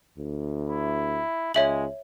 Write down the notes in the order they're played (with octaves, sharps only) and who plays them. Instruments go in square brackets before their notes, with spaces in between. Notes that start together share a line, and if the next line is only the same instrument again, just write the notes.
[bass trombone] D2
[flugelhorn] E4
[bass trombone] C#2 [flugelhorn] G#3 [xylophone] C#5 E5 F#7